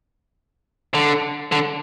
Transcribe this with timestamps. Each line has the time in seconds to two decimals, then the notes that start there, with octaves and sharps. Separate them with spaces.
0.94 D3
1.52 D3